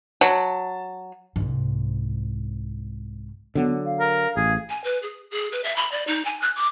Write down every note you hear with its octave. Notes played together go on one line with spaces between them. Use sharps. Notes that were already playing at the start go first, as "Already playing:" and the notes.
F#3 A5
C2 G#2
D3 F#3 B3
F5
A#4
A1 G#4
G#5
B4
G#4
G#4
B4
E5
B5
D5
D#4
G#5
F#6
D6